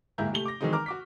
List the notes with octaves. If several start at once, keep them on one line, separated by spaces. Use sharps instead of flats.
D1 G#2 A#3 E4 A#5 G6
C3 A3 F7 G7
D6 A#6
D#3 E3 F#3 G#3 C4 D#4
A#4 A#5 D6 F6
F#4 D6 B6